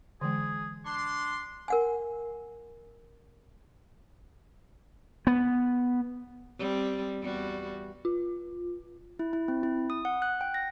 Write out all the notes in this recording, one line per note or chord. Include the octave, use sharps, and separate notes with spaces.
D3 E3 G#3 G#4
D4 C6
A#4 F#5 G#5
B3
G3 C4
E2 G3 F#4
F4
E4
E4
C4
E4
D#6
F#5
F#6
G5
A#6